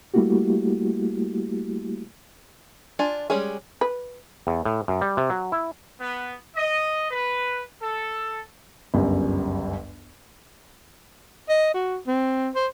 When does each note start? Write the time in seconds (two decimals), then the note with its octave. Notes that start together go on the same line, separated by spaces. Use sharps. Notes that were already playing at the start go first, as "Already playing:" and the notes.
0.14 G3 A3 A#3 E4 F#4 G4
2.99 D4 F4 G#5
3.30 G3 G#3 C#4 G#4
3.81 B4
4.47 E2
4.65 A2
4.88 F#2
5.01 G3
5.17 C3
5.30 F#3
5.52 E4
5.99 B3
6.56 D#5
7.10 B4
7.80 A4
8.94 G1 C#2 F#2 G3
11.49 D#5
11.74 F#4
12.07 C4
12.55 C5